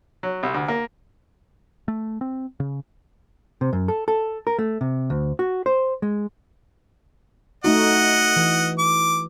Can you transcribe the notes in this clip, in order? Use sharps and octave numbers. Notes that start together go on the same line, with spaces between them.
F#3
C2
D2
A#3
A3
C4
C#3
C3
F#2
A4
A4
A#4
A3
C3
D2
F#4
C5
G#3
A3 D#4 F#4 D#5 F#5
E3
D6